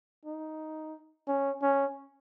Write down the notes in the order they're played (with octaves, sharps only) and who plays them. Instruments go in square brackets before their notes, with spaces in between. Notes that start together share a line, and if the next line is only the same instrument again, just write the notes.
[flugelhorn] D#4
C#4
C#4